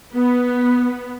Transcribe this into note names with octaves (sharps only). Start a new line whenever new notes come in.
B3